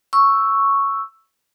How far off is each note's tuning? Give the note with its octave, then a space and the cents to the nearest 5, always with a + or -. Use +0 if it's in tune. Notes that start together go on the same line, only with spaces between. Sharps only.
C#6 +0 E6 +0